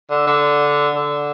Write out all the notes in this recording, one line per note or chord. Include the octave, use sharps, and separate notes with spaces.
D3
D3
D3